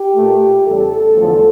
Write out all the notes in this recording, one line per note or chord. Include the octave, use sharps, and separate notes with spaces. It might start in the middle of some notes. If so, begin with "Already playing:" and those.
Already playing: G4
A#2 A3
E2 C#3 G3 A4
E2 D3 F3 A3